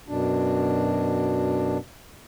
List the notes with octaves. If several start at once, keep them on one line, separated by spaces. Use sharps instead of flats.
F#2 B2 D4